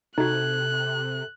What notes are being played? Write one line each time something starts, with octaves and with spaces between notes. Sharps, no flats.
C3 D#4 F#4 A4 F#6 G#6